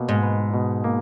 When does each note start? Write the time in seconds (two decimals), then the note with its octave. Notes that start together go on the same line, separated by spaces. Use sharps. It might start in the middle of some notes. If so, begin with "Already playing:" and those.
Already playing: B2 A#3
0.09 G#2
0.23 B4
0.54 B2
0.84 A#3